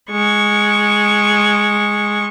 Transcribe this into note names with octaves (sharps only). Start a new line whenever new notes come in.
G#3 C#6